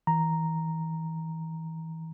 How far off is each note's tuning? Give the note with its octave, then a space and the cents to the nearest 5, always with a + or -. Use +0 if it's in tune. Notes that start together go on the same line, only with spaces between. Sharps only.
E3 -25 A#5 +0